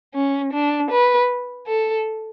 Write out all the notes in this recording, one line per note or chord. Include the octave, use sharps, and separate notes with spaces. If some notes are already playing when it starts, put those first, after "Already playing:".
C#4
D4
B4
A4